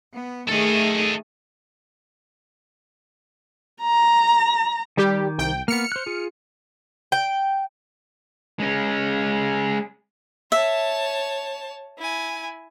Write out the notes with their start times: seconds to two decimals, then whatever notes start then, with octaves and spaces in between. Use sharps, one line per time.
0.13 B3
0.48 D#3 A3 G#4 A4 D#5
3.82 A#5
4.97 D#3 G3 G4 D6 G6
5.38 C2 G5
5.68 A#3 B3 F6 C#7
5.92 C5 F#6
6.06 F4 G#4
7.12 G5
8.60 G#3 C#4
10.52 C#5 E5 A5
11.98 E4 G#5